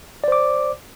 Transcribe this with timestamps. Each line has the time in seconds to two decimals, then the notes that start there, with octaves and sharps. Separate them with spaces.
0.24 D5
0.28 C5
0.32 D6